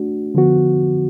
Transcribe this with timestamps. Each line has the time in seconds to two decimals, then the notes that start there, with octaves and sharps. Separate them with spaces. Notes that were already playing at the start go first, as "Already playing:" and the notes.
Already playing: A3 D4 F#4
0.35 D3 F3 B3 F#4